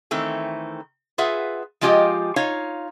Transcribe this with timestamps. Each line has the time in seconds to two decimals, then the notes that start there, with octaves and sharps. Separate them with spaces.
0.11 D#3 E3 A3 C4
1.18 F4 G#4 B4 E5 F#5
1.81 F3 G#3 F4 G4 D#5 G5
2.36 D#4 F4 C#5 F5